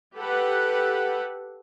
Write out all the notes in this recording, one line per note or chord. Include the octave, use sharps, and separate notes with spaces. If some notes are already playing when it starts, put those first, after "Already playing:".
G4 A4 B4 F#5